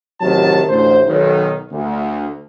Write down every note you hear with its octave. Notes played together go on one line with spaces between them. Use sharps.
A1 C3 D#3 F#3 A5
A1 D2 C5
B1 D#3
D2